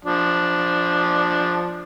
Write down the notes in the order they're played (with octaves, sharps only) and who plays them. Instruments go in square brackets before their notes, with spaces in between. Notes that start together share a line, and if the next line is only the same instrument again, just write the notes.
[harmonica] F3 D4